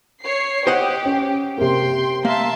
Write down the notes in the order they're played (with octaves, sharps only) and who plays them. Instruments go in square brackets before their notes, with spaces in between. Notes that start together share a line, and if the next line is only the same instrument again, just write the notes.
[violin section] C#5 C7
[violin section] G4 [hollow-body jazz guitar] C5 D#5 F#5
[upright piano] C#4
[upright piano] C3 A#3 [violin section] G5 C6
[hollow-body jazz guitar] A#3 [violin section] E5 A5 C6